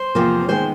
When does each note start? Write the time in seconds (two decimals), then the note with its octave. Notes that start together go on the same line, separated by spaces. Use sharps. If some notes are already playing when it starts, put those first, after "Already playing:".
Already playing: C5
0.15 E2 C3 F3 A#3
0.48 D#3 G#3 B3 C5